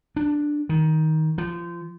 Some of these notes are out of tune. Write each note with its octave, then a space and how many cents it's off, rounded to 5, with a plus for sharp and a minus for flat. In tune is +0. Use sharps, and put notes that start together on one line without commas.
D4 +5
D#3 +15
F3 -25